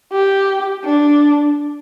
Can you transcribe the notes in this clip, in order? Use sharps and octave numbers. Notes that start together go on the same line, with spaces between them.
G4
D4